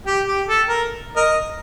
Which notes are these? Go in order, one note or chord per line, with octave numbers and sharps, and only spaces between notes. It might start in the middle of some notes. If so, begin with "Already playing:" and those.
G4
G4
A4
A#4
A#4 D#5